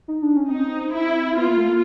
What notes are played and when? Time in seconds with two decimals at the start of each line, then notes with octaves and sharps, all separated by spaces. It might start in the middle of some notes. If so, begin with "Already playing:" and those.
0.08 D#4
0.22 D4
0.36 C#4
0.50 C4 D#4
0.94 E4
1.37 B3 F4
1.48 A#3
1.57 A3
1.68 A#3